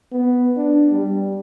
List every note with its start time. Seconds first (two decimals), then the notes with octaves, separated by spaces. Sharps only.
0.12 B3
0.57 D4
0.91 G3